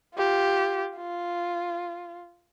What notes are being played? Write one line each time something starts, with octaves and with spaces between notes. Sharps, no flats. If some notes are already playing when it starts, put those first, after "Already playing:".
F4 G4
F4